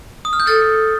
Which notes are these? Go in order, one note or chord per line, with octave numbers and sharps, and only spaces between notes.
D#6
F6
G6
A4 F6 A6